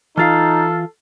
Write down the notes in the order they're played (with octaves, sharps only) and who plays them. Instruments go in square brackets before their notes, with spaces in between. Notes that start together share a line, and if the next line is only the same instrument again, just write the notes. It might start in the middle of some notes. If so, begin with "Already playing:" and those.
[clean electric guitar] E3 F4 F5 [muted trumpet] D#4 [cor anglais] A4 [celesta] F6 A6 C7